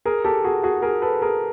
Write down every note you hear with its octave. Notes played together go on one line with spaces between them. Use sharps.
G#4 A#4
G4 A4
F#4 G#4
F#4 G#4
G#4 A#4
A4 B4
G#4 A#4